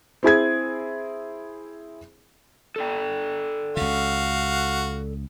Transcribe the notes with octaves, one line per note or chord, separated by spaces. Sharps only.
C4 E4 G#4 G#6
A4 D5 G5
C#2 C#3 F#4 F5